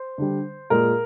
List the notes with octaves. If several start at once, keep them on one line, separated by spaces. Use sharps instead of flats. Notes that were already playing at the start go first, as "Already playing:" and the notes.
Already playing: C5
D3 G3
A#2 G#3 A#4